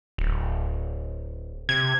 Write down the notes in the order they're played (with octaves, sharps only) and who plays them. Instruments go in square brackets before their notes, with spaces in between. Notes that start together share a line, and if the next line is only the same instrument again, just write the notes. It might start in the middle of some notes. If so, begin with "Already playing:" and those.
[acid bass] D1
[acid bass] C3 [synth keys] G#6